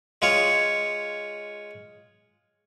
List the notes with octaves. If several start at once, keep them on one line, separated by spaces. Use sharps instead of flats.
G#3 F4 C#5